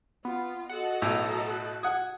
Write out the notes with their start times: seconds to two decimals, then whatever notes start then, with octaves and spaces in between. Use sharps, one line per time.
0.25 B3 F4
0.70 F#4 A4 D#5 F#5
1.02 B1 A2 A#5
1.51 F#6
1.83 F#5 D#6 G#6